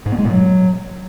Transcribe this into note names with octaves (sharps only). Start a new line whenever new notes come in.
G#2
B3
G#3
A#2
F#3